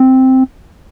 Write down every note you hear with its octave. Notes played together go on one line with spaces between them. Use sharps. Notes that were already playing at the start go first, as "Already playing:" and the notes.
Already playing: C4